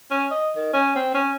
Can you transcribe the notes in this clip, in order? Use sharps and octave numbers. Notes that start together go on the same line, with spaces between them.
C#4
D#5
D#3
C#4
C4
C#4